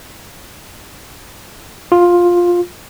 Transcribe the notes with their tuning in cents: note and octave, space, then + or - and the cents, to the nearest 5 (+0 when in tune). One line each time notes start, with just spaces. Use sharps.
F4 +10